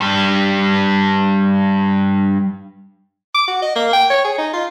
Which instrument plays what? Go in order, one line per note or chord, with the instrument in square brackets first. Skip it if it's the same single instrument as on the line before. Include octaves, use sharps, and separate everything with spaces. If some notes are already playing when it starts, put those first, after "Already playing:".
[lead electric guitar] G2 G3
[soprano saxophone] D6
F#4
D#5
A#3
G5
C#5
G#4
D#4
F4